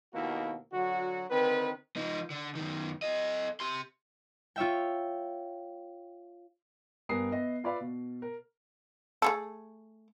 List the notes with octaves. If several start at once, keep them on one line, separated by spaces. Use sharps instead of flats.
D#2 B2 A#3 E4 F#4
D3 F#3 F#4
D3 D#3 C4 B4
F3 D#4
D3
F#2 D#3
A4 D#5
G4 C6
F4 C#5 E5 G5
G2 B3 A#4 G#5 D#6 C7
B3 D#5 E5
F4 B4 D5 E5 F5 B5
B2
A#4
A3 G#4 A4